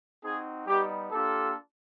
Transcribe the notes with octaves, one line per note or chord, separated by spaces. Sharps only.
C4 D#4 F#4 G#4
G3 B3 D#4 G4
A#3 D4 F4 G4 A4